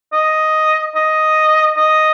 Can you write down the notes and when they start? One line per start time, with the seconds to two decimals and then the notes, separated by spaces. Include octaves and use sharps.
0.13 D#5
0.95 D#5
1.77 D#5